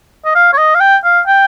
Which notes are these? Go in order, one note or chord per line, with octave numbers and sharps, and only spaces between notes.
D#5
F5
C#5
D#5
F5
G5
F5
G5